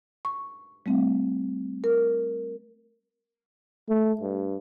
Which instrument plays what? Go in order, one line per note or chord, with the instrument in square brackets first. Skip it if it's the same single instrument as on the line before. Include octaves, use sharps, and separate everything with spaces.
[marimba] C#6
G3 A3 C4
A#4
[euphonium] A3
G2